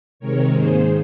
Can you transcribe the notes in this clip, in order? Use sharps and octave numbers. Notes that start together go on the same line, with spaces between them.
C3 D#3 G#3 C4 A#4 C#5
G#2 D#3 A#3 G#4 C5